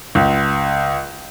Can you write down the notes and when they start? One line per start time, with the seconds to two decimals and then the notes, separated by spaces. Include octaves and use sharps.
0.15 C#2